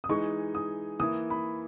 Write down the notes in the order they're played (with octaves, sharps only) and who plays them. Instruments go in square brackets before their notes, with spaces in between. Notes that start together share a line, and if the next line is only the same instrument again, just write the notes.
[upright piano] D#6
[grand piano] E3 G#3 D#4 G#4 [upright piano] C#6
[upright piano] D#6
[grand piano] E3 A#3 E4 [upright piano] D#6
[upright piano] B5